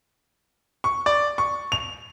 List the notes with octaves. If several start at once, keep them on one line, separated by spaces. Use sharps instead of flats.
C#6
D5
C#6
F7